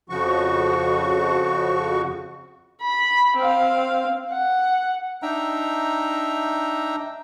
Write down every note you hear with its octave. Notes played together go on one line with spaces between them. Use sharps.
F2 C#3 F3 F#4 C#6
B5
C4 F5
F#5
D4 D#4 E5 G5 A#5